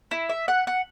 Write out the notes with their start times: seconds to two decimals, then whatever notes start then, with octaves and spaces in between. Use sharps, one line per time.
0.11 E4
0.29 E5
0.48 F#5
0.67 F#5